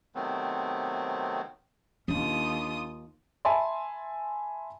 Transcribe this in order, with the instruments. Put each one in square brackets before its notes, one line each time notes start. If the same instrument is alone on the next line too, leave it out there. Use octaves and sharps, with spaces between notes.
[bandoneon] C3 D#3 F#3 A3 B3 C4
[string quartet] D#2 F4 D#6 [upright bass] C#4 D4
[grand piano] E5 G#5 A5 B5 C6